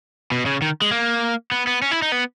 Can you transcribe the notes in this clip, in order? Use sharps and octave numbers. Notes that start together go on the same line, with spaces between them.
B2
C#3
D#3
G#3
A#3
B3
B3
C#4
E4
D#4
B3